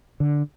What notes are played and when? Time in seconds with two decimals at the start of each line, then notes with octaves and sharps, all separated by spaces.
0.20 D3